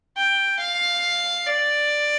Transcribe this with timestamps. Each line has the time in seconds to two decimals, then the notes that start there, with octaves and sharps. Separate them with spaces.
0.17 G5
0.60 F5
1.47 D5